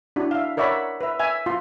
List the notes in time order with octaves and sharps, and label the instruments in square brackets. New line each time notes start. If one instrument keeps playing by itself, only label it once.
[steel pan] D4 E4 F#4
E5 F5
A#4 C#5 D5 E5 F#5 B5
B4 E5
E5 G#5
F4 C6